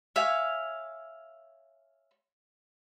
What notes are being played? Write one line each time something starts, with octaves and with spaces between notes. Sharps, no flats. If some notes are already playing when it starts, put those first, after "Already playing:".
C#5 E5 F5 G#5